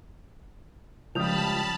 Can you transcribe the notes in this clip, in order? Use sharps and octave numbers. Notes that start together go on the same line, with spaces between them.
C#2 F3 G3 A5 B5 D#6 G6 F7